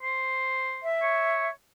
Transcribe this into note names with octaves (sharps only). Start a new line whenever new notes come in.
C5
E5
C#5